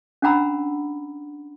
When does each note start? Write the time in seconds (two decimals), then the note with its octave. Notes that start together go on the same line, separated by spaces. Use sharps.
0.22 C#4 D4 F#5 A#5 B5 E6